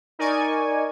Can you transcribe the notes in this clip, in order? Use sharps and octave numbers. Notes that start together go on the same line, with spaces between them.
D#4 A#4 D5 G#5 C#6